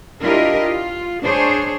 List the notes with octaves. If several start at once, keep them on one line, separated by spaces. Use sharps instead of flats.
D4 E4 F4 G4 A#4 D#5
F4
D4 G#4 C5 C#5